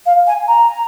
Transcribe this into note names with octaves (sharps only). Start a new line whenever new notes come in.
F5
G#5
A#5